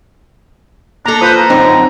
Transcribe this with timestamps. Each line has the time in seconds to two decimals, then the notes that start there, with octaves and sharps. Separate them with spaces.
1.06 A#3 D4 A4 A#5
1.21 F4 B4 C5 D#6
1.37 A#5
1.50 F#2 D3 C4 D4 D#4